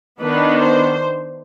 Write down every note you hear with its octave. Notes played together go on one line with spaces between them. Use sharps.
D#3 B3 D4 B4
C5